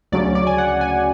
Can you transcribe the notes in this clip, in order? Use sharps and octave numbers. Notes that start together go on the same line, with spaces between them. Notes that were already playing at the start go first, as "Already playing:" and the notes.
D2 C#3 F#3 C#4 D5
D5
G#5
F#5
G#5